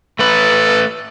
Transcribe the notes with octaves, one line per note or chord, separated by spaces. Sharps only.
A3 A4 B4